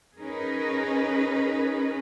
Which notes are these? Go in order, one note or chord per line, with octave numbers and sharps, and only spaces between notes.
C#4 D#4 G#4 A#4 B4